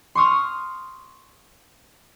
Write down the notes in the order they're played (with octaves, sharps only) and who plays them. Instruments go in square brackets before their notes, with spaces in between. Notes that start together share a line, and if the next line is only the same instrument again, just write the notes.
[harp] C6 C#6 D#6 F6